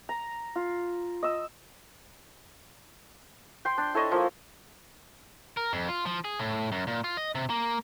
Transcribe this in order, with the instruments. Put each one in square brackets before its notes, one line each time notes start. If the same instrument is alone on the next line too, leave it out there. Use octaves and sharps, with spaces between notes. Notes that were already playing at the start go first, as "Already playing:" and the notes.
[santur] A#5
F4
D#5 E6
G5 C6
D4
E4 A4 C#5 D#5
F3 A#3
[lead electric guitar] A#4
F2
F4
F3
G#4
A2
F#2
A#2
F4
D#5
C3
A#3